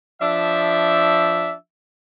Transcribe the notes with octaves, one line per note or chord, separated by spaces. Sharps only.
F3 D4 E5